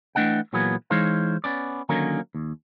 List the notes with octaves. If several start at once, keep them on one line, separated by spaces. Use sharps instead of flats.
E3 A3 D4 D#5 F#5 G5
A#2 E3 F#3 A#3 B3 G#4
E3 G#3 D#4 C5 C#5 F5
B3 C#4 D5
D3 D#3 F#3 A#3 C#4 D#4
D#2